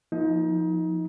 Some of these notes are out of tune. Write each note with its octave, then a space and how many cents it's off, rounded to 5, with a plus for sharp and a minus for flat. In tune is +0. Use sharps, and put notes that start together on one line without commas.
F3 +0 A#3 +40 D#4 +30